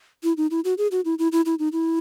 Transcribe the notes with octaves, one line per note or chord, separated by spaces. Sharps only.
E4
D#4
E4
F#4
G#4
F#4
E4
E4
E4
E4
D#4
E4